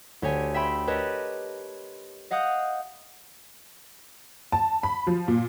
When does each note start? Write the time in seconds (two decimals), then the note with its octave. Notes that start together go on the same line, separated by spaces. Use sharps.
0.22 D2 G4 C#5 G#5
0.54 E5 G5 B5 C6
0.87 G4 A#4 B4 C#5 D#5 A5
2.31 D#5 F5 F#5 D#6 G6
4.52 A5
4.83 B5
5.07 F3
5.28 A#2